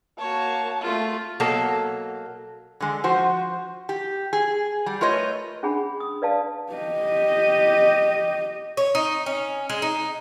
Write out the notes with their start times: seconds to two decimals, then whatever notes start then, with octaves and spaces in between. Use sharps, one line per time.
0.19 A#3 F#4 C#5 A5
0.81 A3 F4
1.40 B2 F#3 A#3 A4
2.80 D3 G#3
3.04 F3 F#4 C5
3.89 G4
4.33 G#4
4.86 G3
5.01 A3 F4 A#4 B4 C#5 D#5
5.63 C#4 D4 G#4 F#5 B5
6.00 D#6
6.22 B4 D5 F5 A5
6.73 G4 D#5
8.77 C#5
8.95 D#4
9.26 C#4
9.69 G#3
9.82 D#4